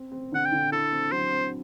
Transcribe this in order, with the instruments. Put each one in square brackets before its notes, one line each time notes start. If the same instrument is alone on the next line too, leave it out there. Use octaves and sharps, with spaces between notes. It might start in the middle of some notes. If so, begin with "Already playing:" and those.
Already playing: [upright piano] C4
C4
[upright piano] D3 [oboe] F#5
[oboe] G5
[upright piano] D3
[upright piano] E4 [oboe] A4
[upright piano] C4
[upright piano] F#3 [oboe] C5
[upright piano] C4